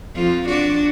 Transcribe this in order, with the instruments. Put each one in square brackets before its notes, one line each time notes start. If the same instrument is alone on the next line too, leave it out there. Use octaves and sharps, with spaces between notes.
[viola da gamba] F2 F3 F4
D4 F#4 D5